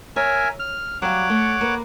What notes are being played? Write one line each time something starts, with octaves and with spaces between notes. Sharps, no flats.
A#4 C#5 E5 G#5
F6
F#3 G3 C#5 F5 F#5 D6
A3
A#3 B4